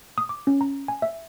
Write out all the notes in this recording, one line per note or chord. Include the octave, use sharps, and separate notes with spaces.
D#6
D6
C#4
A#5
G#5
E5